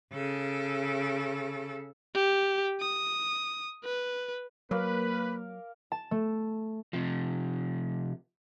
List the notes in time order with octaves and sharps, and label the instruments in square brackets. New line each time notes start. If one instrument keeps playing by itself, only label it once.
[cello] C#3 A4
[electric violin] G4
D#6
B4
[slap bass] F#3 [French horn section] A#3 [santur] A#4 F5 D6 [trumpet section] B4
[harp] A5
A3
[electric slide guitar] C3 F3